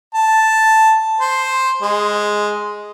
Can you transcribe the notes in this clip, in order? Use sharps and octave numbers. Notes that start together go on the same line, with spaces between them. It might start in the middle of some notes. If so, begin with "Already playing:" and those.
A5
C5
G#3